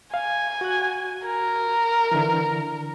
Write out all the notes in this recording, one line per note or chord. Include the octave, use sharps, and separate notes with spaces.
F5 G#5
F#4 F#6
A#4
D3 E3